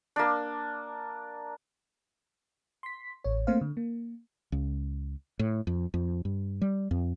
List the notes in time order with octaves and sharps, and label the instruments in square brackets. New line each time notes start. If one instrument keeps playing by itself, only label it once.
[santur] A#3 D4
[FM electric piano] C6 B6
A1 C#5
A3 A#3 C4 C5 F5
D3
A#3
[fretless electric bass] C#2
A2
F2
F2
G2
G3
F2